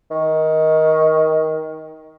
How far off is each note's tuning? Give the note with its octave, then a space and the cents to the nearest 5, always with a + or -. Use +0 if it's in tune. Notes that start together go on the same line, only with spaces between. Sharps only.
D#3 +15